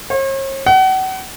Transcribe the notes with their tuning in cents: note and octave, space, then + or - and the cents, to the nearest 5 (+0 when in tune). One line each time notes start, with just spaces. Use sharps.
C#5 -45
F#5 +35